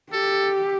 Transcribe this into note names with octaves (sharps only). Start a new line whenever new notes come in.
G4 A4